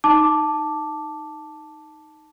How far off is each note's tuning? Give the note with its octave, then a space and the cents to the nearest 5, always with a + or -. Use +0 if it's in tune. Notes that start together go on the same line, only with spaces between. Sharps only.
D#4 +0 A5 +0 D6 +0